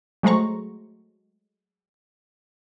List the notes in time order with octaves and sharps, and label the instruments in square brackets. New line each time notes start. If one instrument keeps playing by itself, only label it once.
[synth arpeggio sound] F#3 G#3 A3 C5 A#5 C#6